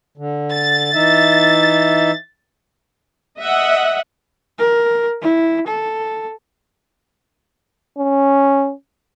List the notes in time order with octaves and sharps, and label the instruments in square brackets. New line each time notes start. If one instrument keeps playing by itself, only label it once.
[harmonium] D3
[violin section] A6
[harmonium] E3 D#4 E5
[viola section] D#5 E5 F#5
[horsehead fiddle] A#4
E4
A4
[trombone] C#4